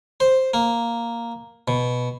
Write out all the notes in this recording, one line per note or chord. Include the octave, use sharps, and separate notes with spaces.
C5
A#3
B2